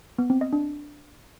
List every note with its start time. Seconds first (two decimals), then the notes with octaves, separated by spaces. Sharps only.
0.18 B3
0.30 C4
0.41 D#5
0.53 D4